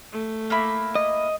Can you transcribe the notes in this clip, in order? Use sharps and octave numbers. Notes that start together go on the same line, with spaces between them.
A3
A#3 E4 B5
D#5